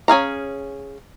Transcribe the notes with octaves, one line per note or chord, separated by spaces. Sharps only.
C#4 G#4 F5 A#5